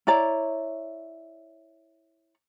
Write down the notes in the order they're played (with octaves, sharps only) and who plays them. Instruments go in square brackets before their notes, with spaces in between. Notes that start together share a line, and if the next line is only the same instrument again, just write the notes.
[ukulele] E4 C#5 D5 A#5